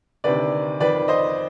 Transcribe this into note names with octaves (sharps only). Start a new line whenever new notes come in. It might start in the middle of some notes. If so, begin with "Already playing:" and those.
D2 C3 D#3 B4 D5
F2 D#3 B4 D5
C5 D#5